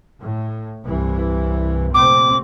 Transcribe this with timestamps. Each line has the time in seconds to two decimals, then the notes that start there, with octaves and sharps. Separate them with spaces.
0.20 A2
0.84 C2 G2 E3
1.94 F1 A#2 C4 D6